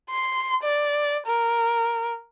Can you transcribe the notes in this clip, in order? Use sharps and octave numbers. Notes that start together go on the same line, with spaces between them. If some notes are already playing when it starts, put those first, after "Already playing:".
C6
D5
A#4